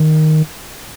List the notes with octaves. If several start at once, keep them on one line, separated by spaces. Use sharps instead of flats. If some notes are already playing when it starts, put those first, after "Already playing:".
Already playing: D#3